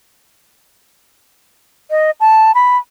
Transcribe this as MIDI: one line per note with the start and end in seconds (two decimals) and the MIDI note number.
1.91 2.11 75
2.20 2.52 81
2.55 2.77 83